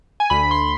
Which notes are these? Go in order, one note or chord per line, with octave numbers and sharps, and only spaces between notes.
G#5
D2 B5
C6